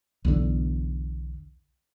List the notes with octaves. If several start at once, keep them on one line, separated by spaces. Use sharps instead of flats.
B1 E2 D3